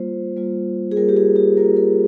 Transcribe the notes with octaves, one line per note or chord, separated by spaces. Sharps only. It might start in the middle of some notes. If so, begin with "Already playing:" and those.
Already playing: G3 A#3 F4 C5
G3 A#3 F4
G#4
G3 A#3 F4 A#4
G4
G#4
G4
G3 A#3 F4 A#4
A#4